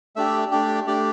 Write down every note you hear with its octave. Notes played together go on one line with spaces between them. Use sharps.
A3 D4 G4 E5
A3 D4 G4
A3 D4 G4 D5